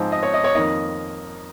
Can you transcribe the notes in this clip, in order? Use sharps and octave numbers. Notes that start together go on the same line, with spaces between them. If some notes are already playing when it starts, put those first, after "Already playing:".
Already playing: G#2 F3 G#3 C4
D#5
C#5
D#5
C#5
F2 D#3 A#3 D#5